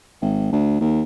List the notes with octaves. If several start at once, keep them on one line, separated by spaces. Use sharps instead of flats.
G#1
D2
D#2